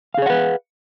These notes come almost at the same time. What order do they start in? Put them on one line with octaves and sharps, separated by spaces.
F5 G#4 C#5 F#5 B4